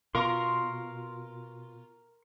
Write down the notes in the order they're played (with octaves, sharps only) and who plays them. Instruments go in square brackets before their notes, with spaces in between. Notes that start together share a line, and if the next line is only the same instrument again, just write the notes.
[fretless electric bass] B2 [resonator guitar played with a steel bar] F4 [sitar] A#4 [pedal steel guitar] C6 C#6